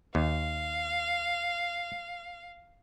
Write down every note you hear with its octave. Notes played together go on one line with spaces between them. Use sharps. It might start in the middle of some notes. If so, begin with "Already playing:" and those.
D#2 F5